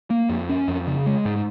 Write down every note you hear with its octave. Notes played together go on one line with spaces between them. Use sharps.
A#3
F2
C#4
F2
C#3
G#3
G#2